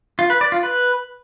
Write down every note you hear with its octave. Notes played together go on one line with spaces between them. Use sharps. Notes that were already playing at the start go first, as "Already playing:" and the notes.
F4
B4
D5
F4
B4